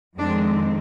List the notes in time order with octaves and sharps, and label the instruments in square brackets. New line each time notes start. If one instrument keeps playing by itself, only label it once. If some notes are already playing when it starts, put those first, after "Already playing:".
[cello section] F2 D#3 G#3 C4 D4